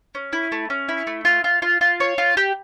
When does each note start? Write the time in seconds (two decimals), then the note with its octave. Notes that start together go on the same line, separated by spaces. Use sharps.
0.15 C#4
0.33 E4
0.52 A3
0.70 C#4
0.89 E4
1.07 A3
1.25 F4
1.44 F4
1.62 F4
1.81 F4
2.00 C#5
2.18 F4
2.37 G4